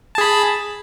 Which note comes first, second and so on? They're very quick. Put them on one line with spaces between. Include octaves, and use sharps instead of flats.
A5 G#4 B5